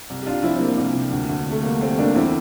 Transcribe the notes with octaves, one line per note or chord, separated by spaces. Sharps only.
C2
G4
C2 D4 F4
F3 C4 E4
C4
F3 A#3
C2
C3
D2
D2
C3
A3
G3 A#3
G3 A3 C4
D2 A#3 D4
E2 C4 E4